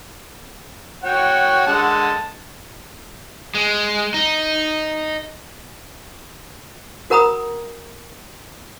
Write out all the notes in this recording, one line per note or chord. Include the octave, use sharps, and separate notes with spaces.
F#4 C#5 F#5 G5
D3 G#3 A5
G#3
D#4
F#4 A#4 F#5 A#5 B5 D#6